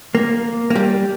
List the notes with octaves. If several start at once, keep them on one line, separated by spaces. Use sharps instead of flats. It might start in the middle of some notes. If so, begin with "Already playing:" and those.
A#3
A#3
G3